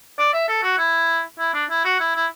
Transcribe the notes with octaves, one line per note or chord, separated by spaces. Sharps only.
D5
E5
A4
F#4
E4
E4
D4
E4
F#4
E4
E4